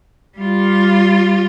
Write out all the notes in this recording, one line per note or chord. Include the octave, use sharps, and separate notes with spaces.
G3 F4